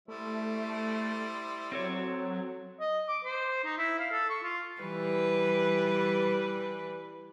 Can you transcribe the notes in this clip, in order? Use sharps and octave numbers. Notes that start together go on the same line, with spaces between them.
G3 A3 E4 C5
F#3 C4 A4 C#5
D#5
D6
C5
D#4
E4
F5
A4
C#6
F4
E3 G3 B4